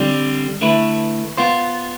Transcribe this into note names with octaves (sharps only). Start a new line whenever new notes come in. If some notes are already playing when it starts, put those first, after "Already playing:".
Already playing: D3 G3 C4
D3 A3 E4 B4
B3 F4 C5